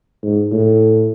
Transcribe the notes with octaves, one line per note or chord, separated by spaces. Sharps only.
G#2
A2